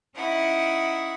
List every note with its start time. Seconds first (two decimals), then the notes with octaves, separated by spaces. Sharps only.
0.16 C#4 D#4 E4 F#5